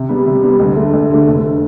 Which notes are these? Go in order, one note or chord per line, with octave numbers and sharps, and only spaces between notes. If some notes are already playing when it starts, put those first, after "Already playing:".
Already playing: C3
G3 B3
C3
G3 B3
D2
D3 A3
D2
D3 A3
F1
D3